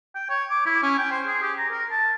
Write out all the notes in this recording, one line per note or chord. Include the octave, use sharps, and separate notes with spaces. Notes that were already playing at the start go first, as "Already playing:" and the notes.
G5
C#5
D6
E4
C#4
G5
C5
G#4
G4
A#5
A#4
A5